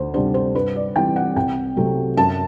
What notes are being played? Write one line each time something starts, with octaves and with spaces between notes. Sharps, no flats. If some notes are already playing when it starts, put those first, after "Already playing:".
Already playing: D2 C5
C3 G3 D4 C5
C5
G2 B4
D5
E3 G3 C4 G5
F#5
C2 G5
C3 F#3 A3
F#2 A5